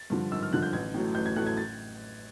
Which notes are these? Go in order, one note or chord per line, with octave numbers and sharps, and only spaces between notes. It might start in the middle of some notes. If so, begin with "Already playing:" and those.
Already playing: A6
G2 D3 F3
G#1 E6
F6
G2 D3 F3 F#6
G6
A1 G#6
A2 F#3 A3
A1 G6
G#6
A2 F#3 A3 F#6
G#6
A6